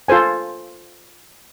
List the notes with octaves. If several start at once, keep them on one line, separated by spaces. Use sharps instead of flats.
F4 A4 C5 G#5